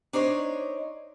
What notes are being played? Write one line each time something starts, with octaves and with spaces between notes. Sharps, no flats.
D4 D#4 C5 C#5